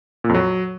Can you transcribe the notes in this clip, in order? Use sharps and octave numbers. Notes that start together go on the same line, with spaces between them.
A#2
F2
F#3